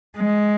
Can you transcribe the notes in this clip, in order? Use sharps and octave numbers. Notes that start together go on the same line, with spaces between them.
G#3